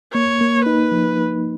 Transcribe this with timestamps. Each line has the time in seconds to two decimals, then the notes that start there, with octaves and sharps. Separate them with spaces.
0.14 A#3 C#5
0.41 A#3
0.65 D#4 B4
0.92 F3